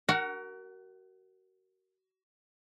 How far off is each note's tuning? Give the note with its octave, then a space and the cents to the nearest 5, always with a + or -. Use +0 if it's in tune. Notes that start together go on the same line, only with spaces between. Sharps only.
F#4 +30 A#4 +0 F#5 +0